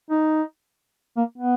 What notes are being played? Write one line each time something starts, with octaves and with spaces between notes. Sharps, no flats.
D#4
A#3
B3